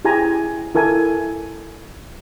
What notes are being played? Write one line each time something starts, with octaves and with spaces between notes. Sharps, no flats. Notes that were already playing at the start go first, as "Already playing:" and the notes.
E4 G4 G#4 G#5 A#5
E4 A4 A#4 G#5